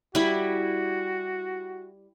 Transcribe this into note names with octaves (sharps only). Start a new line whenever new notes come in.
G3 E4 F#4